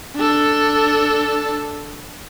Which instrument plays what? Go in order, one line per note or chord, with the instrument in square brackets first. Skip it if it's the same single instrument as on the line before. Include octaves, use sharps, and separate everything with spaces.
[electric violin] D4 A4